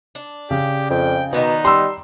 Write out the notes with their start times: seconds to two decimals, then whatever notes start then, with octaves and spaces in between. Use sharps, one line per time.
0.15 D4
0.51 C#3 G4
0.90 F2 G5
1.33 B2 D#3 B3 D#4 D5
1.65 G3 C6 E6